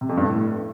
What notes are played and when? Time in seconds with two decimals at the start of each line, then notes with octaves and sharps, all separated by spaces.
0.01 C3
0.09 F2
0.17 G2
0.25 A2